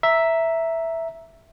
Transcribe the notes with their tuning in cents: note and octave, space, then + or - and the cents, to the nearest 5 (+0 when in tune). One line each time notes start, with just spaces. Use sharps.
E5 +0 A#5 +0